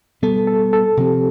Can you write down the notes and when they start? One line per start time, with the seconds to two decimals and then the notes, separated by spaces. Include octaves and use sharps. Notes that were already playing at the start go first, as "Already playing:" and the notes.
0.22 B2 G3 B3 A4
0.47 A4
0.73 A4
0.97 C3 F3 C4 G4